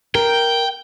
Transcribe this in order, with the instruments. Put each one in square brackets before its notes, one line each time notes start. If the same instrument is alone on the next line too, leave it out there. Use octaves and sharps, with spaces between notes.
[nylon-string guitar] A#4 [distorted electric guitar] G5